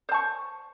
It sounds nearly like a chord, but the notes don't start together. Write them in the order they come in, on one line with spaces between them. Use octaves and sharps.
C5 A5 C#6